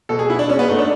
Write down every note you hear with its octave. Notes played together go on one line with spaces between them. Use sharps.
B2 A4
G#4
B2 E4
D4
G#3 C#4
B3
G#2 A3
D4